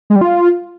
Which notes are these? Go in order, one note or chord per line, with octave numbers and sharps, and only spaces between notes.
G#3
G3
F4